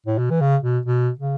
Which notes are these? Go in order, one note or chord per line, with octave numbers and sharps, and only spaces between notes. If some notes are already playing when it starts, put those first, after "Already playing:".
A2
B2
E3
C#3
B2
B2
C#3